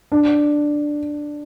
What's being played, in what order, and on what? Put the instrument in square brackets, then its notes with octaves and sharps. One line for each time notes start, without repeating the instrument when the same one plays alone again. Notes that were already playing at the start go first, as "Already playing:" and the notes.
[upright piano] D4